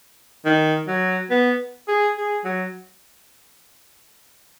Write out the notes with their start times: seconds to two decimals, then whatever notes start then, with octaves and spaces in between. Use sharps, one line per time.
0.45 D#3
0.87 F#3
1.30 B3
1.88 G#4
2.17 G#4
2.44 F#3